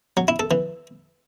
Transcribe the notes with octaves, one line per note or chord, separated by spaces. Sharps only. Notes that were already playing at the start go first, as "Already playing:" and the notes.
F#3
E4
A4
E3